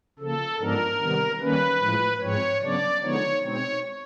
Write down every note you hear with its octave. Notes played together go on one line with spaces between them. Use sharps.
C#3 F3 A#3 A4
G#2 F3 G#3 B3 D4 A#4
C3 D#3 G3 B3
D#3 G3 A#3 C#4 B4
A2 F3 G#3
G#2 F3 G#3 C4 C#5
C#3 F#3 B3 D4 D5
D3 F3 G#3 B3 D#4 C#5
B2 G#3 C4 D#4 C#5